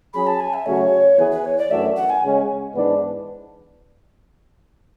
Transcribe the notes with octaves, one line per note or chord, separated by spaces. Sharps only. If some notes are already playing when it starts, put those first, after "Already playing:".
F#3 C#4 G#4 B5
A5
G#5
E5
C#3 F#3 A3 C#4 F#4 C#5
E3 B3 E4 G#4 B4
B4
C#5
D5
F#2 E3 A3 D4 F#4 E5
F#5
G#5
C#3 G#3 C#4
G#2 E3 B3 D4